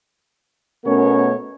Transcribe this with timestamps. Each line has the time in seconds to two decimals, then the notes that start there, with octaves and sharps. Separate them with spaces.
0.85 B2 A3 B3 C#4 A#4 C#5